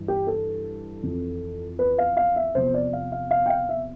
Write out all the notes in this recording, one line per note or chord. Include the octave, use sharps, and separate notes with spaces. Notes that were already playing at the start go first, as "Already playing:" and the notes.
Already playing: G2 E3
G4
A4
F2 E3
B4
F5
F5
E5
E2 C3 F3 C5
D5
F5
F5
F5
G5
F5
E5